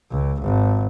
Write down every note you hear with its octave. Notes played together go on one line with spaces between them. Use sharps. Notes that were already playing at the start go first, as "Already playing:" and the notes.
C#2
G#1